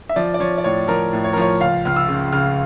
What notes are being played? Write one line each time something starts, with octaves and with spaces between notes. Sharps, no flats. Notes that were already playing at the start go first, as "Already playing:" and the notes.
E5
F3 D5
D5
F3 C#5
D5
A2 C#5
F3 A#4
A2
C#5
A#4
F3 C#5
C#2 F5
C#2 F6
E6
C#3
C#3 F6